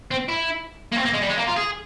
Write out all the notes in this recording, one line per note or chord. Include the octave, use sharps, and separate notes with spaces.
C4
E4
A#3
C4
A#3
G#3
G3
G#3
A#3
F4
G#4